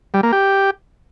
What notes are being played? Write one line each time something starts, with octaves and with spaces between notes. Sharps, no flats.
G3
A#3
G4